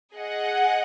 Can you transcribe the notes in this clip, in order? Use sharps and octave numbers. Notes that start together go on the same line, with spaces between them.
G#4 D#5 F#5